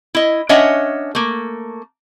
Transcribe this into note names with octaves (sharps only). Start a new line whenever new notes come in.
E4 D#5
C#4 D4 C#5 D#5 E5 F#5
A3 A#3